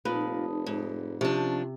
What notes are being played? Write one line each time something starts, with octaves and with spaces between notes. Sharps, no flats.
F1 A#2 D#4 B4 A5 D#6
G#2
C3 F3 C#4 D4